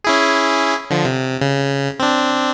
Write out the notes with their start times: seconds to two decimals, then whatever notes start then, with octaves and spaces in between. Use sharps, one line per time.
0.04 C#4 E4 G#4
0.90 D3 F3
1.05 C3
1.41 C#3
2.00 C4 D4